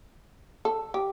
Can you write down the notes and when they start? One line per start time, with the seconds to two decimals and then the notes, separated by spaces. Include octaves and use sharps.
0.65 A4
0.94 G4